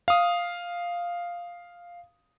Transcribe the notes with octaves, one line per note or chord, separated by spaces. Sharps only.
F5 D#6